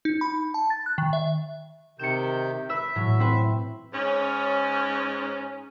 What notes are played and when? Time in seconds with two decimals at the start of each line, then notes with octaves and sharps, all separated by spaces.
0.05 D#4
0.21 B5
0.54 A5
0.70 A6
0.86 F#6
0.98 D#3
1.13 E5
1.99 C3 D#3 G6 C#7 E7
2.69 B4 E5 E6
2.95 A2 F#3
3.20 C4 B4
3.93 G#2 C#4